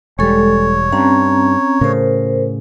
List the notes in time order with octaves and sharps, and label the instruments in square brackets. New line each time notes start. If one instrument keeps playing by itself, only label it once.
[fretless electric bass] E1 G3 [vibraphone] G#3 A4 [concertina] C#5
[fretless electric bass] G2 [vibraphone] C4 C#4 A#5
[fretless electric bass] A2 C#3 [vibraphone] A#4 C5